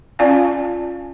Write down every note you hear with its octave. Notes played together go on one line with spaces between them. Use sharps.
C#4 F4 D5 F5 G#5